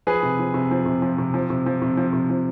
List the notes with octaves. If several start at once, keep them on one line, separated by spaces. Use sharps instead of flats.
F3 G#4 B4
C3
F3
C3
F3
C3
F3
C3
F3
C3
F3
C3
F3
C3
F3